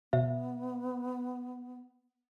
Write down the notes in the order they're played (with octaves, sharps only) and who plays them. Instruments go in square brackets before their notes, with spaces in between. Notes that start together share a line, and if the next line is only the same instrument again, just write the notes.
[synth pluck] B2 [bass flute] B3 [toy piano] E5